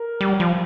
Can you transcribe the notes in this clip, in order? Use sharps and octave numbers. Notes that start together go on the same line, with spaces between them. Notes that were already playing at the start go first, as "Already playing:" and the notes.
Already playing: A#4
G3
F3